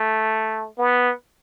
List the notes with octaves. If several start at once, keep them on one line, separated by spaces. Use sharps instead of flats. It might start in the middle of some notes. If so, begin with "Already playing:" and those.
Already playing: A3
B3